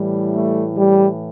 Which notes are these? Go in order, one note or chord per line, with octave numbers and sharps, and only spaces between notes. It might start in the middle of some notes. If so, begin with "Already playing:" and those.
Already playing: A2 E3 G3
A3
G3